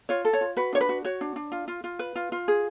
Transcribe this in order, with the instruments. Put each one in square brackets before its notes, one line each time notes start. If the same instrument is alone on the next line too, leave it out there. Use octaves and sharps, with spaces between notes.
[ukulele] F4 C#5
A4
C#5
F4
F#4 B4
D4 C#5
B4
F#4
F#4 C#5
D4
D4
F4
F4
F4
B4
F4
F4
G#4